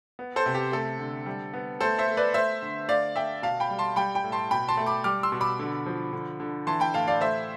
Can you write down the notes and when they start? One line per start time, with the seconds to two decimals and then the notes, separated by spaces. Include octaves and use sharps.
0.19 B3
0.36 A4 C5
0.46 C3
0.54 G4
0.72 A3 A4
0.99 D3
1.26 G3
1.54 B3
1.81 A3 A4 C5
1.99 C5 E5
2.07 A3
2.17 B4 D5
2.34 A3 C5 E5
2.62 D3
2.89 A3 D5 F5
3.16 A3 E5 G5
3.42 B2 F5 A5
3.60 G5 B5
3.70 G3
3.79 A5 C6
3.96 G3 G5 B5
4.15 G5 B5
4.24 A2
4.32 A5 C6
4.51 B2 G5 B5
4.68 A5 C6
4.77 A3
4.86 B5 D6
5.04 G3 D6 F6
5.23 C6 E6
5.32 B2
5.41 B5 D6
5.59 D3
5.86 F3
6.13 D3
6.40 D3
6.67 E3 A5 C6
6.80 G5 B5
6.94 A2 F5 A5
7.08 D5 F5
7.21 A3 C5 E5